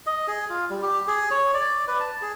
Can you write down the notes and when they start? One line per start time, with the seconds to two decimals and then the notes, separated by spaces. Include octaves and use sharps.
0.06 D#5
0.28 G#4
0.49 F4
0.70 G3
0.82 G4
1.07 G#4
1.31 C#5
1.54 D5
1.88 B4
2.00 A5
2.22 G#4